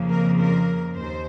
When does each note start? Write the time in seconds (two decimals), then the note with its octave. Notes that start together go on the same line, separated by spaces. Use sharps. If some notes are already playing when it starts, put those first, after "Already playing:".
Already playing: F2 C#3 F3 A#3
0.10 A#4
0.40 A#4
0.98 D#2 C5